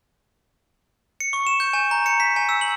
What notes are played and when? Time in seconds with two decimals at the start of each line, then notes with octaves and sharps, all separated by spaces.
1.20 C#7
1.33 C#6
1.47 E7
1.60 G6
1.73 G#5
1.91 A#5
2.06 C#7
2.20 B6
2.36 G#5
2.49 E6
2.61 F#7